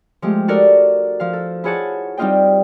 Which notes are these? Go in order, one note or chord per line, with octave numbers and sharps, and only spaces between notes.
F3 G#3 A3 G4
D#4 F#4 A4 A#4 D5
F3 F5
A4
E4 F4 G#4 C#5 F#5 A5
G3 C4 D#4 F4 D#5 G5